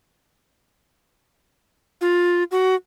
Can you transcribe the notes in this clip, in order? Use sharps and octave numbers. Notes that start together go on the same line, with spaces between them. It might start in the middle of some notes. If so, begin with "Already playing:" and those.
F4
F#4